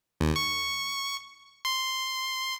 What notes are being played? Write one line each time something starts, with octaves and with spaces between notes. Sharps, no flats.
D#2
C#6
C6